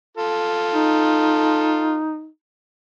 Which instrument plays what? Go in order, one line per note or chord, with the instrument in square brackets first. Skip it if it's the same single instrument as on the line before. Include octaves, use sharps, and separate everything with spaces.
[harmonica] F4 A4
[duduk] D#4